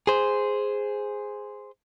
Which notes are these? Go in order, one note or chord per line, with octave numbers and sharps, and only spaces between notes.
G#4 C5